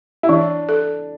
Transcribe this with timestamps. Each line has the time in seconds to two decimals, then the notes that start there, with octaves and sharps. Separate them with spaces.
0.23 E4
0.29 E3 D4
0.69 A4